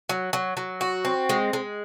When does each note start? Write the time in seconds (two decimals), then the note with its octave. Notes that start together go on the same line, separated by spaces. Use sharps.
0.09 F#3
0.33 F#3
0.57 F#3
0.81 F#4
1.05 C4
1.29 G#3
1.53 G#3